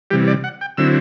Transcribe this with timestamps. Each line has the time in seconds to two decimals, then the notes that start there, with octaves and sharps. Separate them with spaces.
0.11 C3 E3 G3 G4
0.27 D5
0.44 F#5
0.61 G5
0.77 D3 F#3 C4 E4 E6